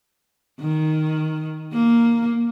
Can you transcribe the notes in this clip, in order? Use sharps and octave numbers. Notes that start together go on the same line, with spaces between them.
D#3
A#3